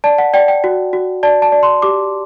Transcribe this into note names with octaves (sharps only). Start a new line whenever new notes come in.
D5 A5
F#5
D5 G5
G5
F#4
F#4
D5 A5
A5
D5
C6
G4 D6